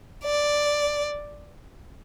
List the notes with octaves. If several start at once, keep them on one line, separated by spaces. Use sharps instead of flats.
D5